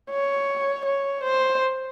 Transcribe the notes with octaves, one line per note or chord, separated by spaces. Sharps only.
C#5
C#5
C5